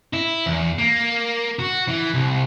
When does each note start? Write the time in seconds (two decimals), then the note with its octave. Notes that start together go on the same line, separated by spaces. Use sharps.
0.13 E4
0.46 E2
0.79 A#3
1.59 F#4
1.88 E3
2.14 C2